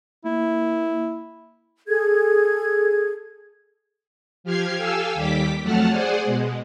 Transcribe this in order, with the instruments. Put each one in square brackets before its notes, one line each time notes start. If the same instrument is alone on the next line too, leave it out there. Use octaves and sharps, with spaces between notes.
[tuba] A#3 [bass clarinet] E4
[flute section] G#4 A4 G#6
[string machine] F3 G4 F6 G#6 C7
G4 A4 F5 G#5 E6
D#2 G3 G4 D6 B6
F2 F#3 A3 F#5 A5 F6
G#4 C5 D5 F#5 G#5
B2 G#3